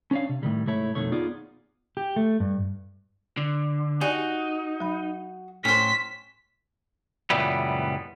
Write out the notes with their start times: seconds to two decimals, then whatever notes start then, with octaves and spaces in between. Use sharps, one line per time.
0.11 C#4 D4 C#5 D5 F5
0.29 C3
0.43 A2 D#3 G3
0.66 C2 G#2 A3 E4 C#5
0.95 F2 B2 D#3 A3 C#5
1.12 B3 D#4 F4 G#4 D5
1.97 G4
2.16 A3
2.40 G2
3.37 D3
4.01 D#4 F#4 G4 D5 G#5
4.80 F#3 B5
5.65 A2 C#4 C5 G#5 B6
7.30 C#2 F#2 A#2 E3 G3 B3